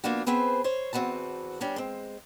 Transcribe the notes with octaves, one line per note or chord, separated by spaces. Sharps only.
F3 A#3 B3 D4 F#4
B3 C4 G#4 B4 C5
C5 C#5
E2 C4 F#4 B4 A5
G3 C#4 D4
G#3 C4